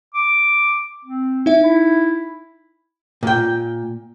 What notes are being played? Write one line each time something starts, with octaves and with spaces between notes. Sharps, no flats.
D6
C4
D#4 E5
E4
A#2 G5